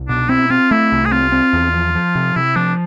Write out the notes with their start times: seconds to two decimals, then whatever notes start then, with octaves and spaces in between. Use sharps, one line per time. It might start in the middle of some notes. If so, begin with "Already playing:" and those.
Already playing: C2
0.09 B2 D4
0.29 C4 E4
0.50 C4 F4
0.71 A3 E4
0.92 C2
1.05 G#4
1.12 C4 F4
1.32 C4
1.53 E2
1.74 F3
1.95 F3
2.15 C3
2.36 C3 E4
2.56 F3 D4